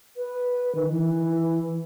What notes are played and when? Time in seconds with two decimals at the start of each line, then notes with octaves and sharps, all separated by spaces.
0.17 B4
0.75 D#3
0.89 E3